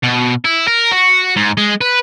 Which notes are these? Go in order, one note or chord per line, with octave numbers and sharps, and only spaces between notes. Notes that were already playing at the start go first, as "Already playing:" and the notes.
B2
E4
A#4
F#4
G#2
G#3
B4